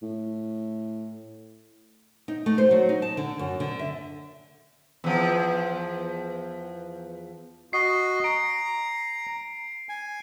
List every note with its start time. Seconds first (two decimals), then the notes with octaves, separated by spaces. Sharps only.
0.02 A2
2.28 D#4
2.46 A3
2.58 C5
2.71 F#3
2.89 D#4
3.02 A5
3.17 D3
3.39 F#2
3.60 D3
3.79 E5
5.04 E2 F3
7.73 F#4 D#5 C7
8.24 A#5 D7
9.89 G#5